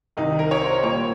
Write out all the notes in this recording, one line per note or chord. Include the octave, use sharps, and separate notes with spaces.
C2 C3 D#3 D#4
A#4
C#5
C5
A#2 G3 A#3 C#5